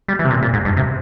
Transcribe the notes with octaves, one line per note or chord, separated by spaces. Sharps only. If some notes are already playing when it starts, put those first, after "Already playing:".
G3
E3
C3
A#2
A#2
G#2
G2
C3